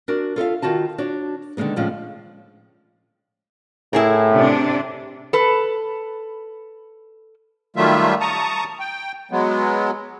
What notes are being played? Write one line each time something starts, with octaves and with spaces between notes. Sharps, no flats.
D4 F#4 A#4
F4 A4 E5 F5
D#3 F4 F#4 A5
D4 F#4 C#5
D3 D#3 F3 G#3 B3
A2 D3 F3 G#3 C#4 F4
A2 E4 G#4 A#4
C3 D4
A4 B4
D#3 F#3 G3 A3 F4 E5
A5 A#5 C#6 D#6
G5
F#3 G#3 B3